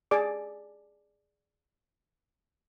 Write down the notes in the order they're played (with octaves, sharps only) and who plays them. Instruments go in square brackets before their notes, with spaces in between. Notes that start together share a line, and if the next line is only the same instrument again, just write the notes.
[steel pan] G#4 D5 D6